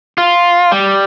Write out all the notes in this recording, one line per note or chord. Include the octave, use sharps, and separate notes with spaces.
F4
G3